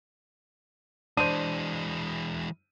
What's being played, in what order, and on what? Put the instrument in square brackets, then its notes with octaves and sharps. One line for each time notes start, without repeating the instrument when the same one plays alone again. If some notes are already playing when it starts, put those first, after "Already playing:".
[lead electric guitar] E3 G#3 [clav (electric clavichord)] D4 C5 [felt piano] D#7